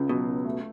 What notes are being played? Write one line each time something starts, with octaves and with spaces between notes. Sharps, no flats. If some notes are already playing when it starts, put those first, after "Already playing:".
Already playing: C#2 C#3
B2 F#3
C#2
A3